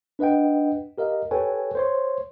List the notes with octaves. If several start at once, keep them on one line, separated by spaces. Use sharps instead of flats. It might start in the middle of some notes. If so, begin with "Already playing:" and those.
D4 B4 D#5 F#5 G5
G4 A#4 D#5 F5
G4 A4 B4 C#5 G5 G#5
C5 C#5 C6